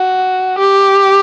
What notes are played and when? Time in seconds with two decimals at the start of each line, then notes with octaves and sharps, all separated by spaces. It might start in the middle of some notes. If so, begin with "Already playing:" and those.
Already playing: F#4
0.58 G4